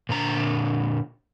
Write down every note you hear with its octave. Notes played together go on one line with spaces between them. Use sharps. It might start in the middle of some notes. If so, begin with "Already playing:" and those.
A#2 D3 A#5